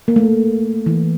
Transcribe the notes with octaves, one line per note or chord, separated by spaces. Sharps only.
A#3
A3
E3